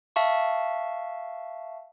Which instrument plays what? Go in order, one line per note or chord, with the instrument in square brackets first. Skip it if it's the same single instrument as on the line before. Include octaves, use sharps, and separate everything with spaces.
[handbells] E5 F5 A5 C#6